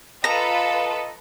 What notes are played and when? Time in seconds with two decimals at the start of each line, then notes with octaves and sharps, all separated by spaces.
0.24 F4 A4 B4 D#5 F5 A#5